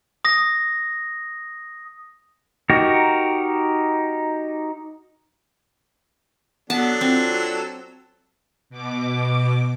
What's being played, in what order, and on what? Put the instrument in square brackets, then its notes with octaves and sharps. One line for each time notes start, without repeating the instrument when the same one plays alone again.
[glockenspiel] D#6 A#6
[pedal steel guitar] D#4 F#4 G4 A#4
[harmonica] F#3 D4 A4 [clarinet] B3 [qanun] A5
[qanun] C4 [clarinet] F4
[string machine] B2 D6